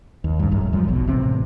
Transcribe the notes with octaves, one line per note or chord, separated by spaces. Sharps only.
D#2
C#2 G2
D1 G#1 F#2
D1 F#2 F3 G3
F1 B1 B2
A1 C3 C4